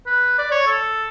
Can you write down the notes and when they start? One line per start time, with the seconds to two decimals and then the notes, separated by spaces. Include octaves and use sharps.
0.06 B4
0.38 D5
0.51 C#5
0.67 A4